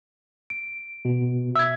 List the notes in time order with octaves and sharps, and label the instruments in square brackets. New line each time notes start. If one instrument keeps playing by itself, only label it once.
[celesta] D7
[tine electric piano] B2
[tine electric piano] E5 G#6 [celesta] E6